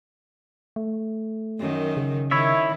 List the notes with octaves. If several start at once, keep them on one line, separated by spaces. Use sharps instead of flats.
A3
F#2 D#3
C#3
D#3 E4 C#5 E5